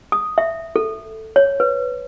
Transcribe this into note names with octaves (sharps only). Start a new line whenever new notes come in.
D#6
E5
A4
C#5
B4